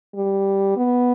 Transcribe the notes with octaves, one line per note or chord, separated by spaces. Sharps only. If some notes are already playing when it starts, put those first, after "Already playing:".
G3
B3